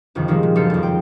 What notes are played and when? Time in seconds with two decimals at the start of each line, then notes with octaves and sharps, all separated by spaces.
0.15 G1 F2 C3 D#3
0.28 D#3 F3 G3 G#3 A#3 C4
0.43 A#2
0.55 F#1 F4 A4 C5 F6 C#7
0.70 G#1 F2
0.83 G5